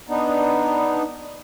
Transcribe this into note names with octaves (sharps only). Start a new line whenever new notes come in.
B3 D4 D#4